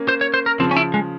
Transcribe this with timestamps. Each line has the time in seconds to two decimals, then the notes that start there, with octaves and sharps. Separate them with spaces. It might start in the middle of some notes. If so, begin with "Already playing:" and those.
Already playing: A#3 C#4
0.08 C5
0.21 C#5
0.34 C5
0.46 A#4
0.59 C#3 F3 C4
0.71 C#4
0.76 E4
0.94 G#3